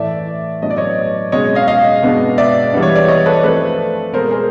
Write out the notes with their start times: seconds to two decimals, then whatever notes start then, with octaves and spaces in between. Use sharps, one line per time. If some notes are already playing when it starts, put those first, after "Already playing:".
Already playing: A2 E3 A3 D5 E5
0.62 A2 F#3 B3 D4 D#5
0.70 D5
0.77 C#5 D#5
1.32 B2 G#3 C#4 C#5 D#5
1.55 D#5 F5
1.68 D#5 F5
2.02 B2 G#3 B3 D4
2.38 D5 E5
2.73 E3 G3 B3 D4
2.82 C#5
2.95 D5
3.08 C#5 D#5
3.26 A4 B4
3.43 F3 A3 C4 A4 B4
4.13 B2 G#3 C4 A#4 C5
4.31 G#4 A#4